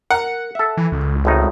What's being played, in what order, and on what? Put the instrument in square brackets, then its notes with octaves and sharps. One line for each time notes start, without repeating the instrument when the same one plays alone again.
[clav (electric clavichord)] A#4 [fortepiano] F#5
[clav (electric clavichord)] A4 E5
[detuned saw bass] E3
C#2
[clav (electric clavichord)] G#1 A2 D#4